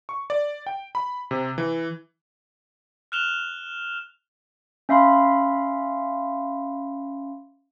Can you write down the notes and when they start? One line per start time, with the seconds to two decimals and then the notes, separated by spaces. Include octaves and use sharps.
0.09 C#6
0.30 D5
0.66 G5
0.95 B5
1.31 C3
1.58 E3
3.12 F6 F#6 E7 F7 G7
4.89 C#4 E5 F5 B5 C6